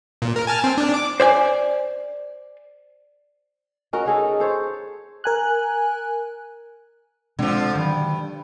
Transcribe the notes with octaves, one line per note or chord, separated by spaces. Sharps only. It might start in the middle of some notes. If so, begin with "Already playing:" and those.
A#2
A#4
G#5 A5 F6
C4
D4
D6
C5 D5 G#5
C#4 D#4 F#4 A#4
D#4 G#4 A4
A4 C5 C#5
A#4 G#5 F#6
B2 D3 F3 G#3 C4
G2 D3 D#3 F#3